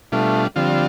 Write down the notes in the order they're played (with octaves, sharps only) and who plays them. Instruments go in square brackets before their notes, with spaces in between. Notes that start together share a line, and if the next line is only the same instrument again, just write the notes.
[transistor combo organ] B2 G3 D4 F4 [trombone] A3
[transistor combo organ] D3 F3 C4 F4 [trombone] G3